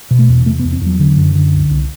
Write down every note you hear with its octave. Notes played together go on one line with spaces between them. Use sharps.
B2
A3
E2
C3 A3
B3
E2
C4
E2 F#3
D3
F#2
D3
C2
C2